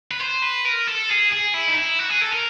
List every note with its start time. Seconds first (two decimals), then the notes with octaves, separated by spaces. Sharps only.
0.11 B4
0.20 C5
0.42 B4
0.65 A#4
0.87 A4
1.09 G#4
1.32 G#4
1.54 E4
1.68 D#4
1.77 E4
1.99 F#4
2.10 G#4
2.21 A4
2.32 A#4